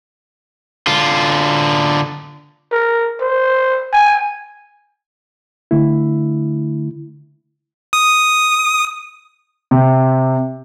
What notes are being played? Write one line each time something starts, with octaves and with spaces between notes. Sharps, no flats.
D3 F4
A#4
C5
G#5
D3 A3 E4
D#6
C3